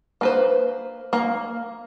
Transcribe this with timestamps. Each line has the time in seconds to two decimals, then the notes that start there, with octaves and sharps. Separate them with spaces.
0.21 A#3 B4 C5
1.13 A#3